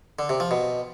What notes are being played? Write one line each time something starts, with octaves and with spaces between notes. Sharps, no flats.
D3
C3
F3
B2